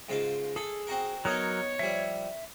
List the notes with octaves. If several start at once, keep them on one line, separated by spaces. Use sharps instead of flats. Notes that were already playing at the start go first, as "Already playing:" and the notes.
G#2 C#3 F4
G#4 A4
C4 F#4 A#4
F#3 B3 D#4 A#4 C#5 D#6
F3 G3 E5